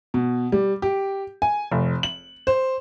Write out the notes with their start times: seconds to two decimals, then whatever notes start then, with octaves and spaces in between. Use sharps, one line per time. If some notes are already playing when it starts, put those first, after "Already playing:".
0.14 B2
0.52 G3
0.82 G4
1.42 G#5
1.71 F1
2.03 F#7
2.47 C5